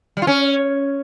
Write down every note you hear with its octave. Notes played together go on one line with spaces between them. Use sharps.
G3
F4
C#4